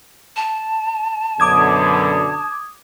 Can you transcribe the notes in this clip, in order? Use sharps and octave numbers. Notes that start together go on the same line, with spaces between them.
A5
F#2 B2 D3 D6 D#6 G#6